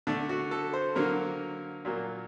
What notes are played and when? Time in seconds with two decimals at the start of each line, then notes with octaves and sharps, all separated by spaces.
0.07 D3 A3 D4
0.29 F#4
0.51 A4
0.73 C5
0.96 D3 F#3 A#3 A#4
1.85 A#2 F#3 A#3